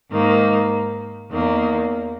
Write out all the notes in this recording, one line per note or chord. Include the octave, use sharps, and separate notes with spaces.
G#2 D#3 A#3
E2 D#3 A#3